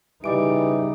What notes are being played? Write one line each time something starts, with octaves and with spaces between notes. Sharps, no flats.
C#3 E3 G3 D#4 D#5 D6 D7